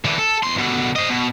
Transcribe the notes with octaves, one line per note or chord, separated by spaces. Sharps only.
D3 E3
A4
E2 C6
B2 D3
C5 D#5
B2